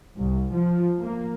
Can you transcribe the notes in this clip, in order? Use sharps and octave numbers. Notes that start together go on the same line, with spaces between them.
C2
F3
A#3